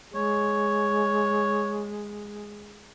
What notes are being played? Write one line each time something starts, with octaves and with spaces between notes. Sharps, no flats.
G#3 C#5